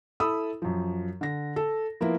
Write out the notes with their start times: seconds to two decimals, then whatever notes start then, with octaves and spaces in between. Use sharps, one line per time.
0.20 E4 A4 B5 D#6 E6
0.62 F#2 F3
1.21 D3 A#6
1.56 A4
2.01 F3 A#3 B3 E4